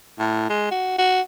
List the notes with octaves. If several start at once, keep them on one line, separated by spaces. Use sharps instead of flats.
A2
G#3
F#4
F#4